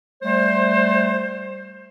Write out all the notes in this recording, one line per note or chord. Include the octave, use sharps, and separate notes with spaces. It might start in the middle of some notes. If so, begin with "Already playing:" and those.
G3 A3 C5